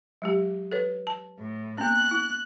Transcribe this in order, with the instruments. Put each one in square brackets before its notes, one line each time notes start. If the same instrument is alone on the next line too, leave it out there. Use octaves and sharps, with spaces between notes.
[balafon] F#3 G#3 G4
A4 B4 C#5
A5
[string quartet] A2
[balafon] A#3 B3 C#4 [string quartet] F#6
[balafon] E4